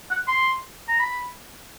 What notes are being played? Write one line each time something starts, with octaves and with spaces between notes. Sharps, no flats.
F#5
C6
A#5
B5